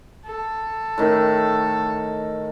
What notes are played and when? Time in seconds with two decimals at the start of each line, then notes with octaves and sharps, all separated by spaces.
0.25 A4
0.98 A2 D#3